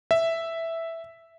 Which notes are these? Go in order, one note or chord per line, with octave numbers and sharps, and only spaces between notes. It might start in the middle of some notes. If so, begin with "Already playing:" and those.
E5